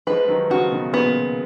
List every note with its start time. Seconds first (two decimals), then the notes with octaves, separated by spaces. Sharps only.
0.07 F3 G#3 B4
0.24 G#3
0.28 D#3 F#3
0.50 C#3 F3 F#4
0.71 B2 D#3
0.94 A#2 C#3 B3